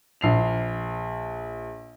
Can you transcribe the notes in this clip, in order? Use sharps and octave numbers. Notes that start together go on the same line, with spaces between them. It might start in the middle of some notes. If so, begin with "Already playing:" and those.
A#1 C7 F7